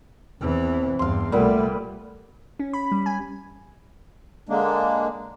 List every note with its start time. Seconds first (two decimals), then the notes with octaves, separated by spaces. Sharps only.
0.41 E2 E3 C4
0.99 E2 G2 F5 C6
1.32 C2 A#2 G3 A3 B3 B4
2.59 C#4
2.73 B5
2.92 G3
3.06 G#5
4.49 D3 G#3 A#3 D4